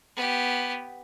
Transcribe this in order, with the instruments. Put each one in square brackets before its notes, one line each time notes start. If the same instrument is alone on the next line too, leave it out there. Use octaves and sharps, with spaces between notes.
[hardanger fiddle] B3 G4